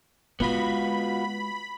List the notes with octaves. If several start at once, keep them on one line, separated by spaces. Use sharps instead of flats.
G#3 B3 F4 F#4 B5